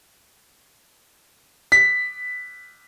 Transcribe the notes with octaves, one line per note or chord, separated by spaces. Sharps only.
B6